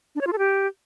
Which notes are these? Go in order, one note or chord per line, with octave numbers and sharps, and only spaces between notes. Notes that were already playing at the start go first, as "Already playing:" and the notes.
D4
C#5
F4
A4
G4